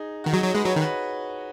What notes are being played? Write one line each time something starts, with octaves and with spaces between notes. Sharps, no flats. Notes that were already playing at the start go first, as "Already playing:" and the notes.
Already playing: D#4 G#4
D#3 F#4
F#3 D#4 G#4
F#3
G#3 F#4 B4
F#3 G#4 C#5
D#3
F#4 B4